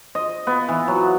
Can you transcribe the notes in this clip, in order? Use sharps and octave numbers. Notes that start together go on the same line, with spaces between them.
D#5
B3
E3
F#3